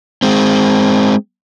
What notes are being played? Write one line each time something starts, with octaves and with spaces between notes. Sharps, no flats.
G#3 C4